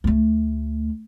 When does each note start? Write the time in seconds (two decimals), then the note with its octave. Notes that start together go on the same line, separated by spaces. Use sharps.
0.04 D2 A3